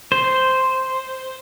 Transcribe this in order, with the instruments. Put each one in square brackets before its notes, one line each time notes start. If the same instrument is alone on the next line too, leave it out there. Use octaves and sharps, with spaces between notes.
[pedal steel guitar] C5